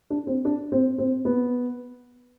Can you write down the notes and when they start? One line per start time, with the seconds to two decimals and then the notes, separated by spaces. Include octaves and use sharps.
0.10 D4
0.27 C4
0.45 D4
0.72 C4
0.98 C4
1.25 B3